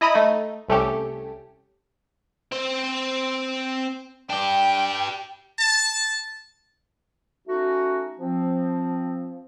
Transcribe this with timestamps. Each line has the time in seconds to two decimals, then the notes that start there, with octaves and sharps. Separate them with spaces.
0.01 E4 D#5 A#5 B5 D#6
0.15 A3 D#4
0.69 C2 A3 C#4 G4
2.52 C4 C5
4.30 D4 G4 G5
5.57 A5
7.47 A3 C#4 D#4 F#4
8.19 F3 C4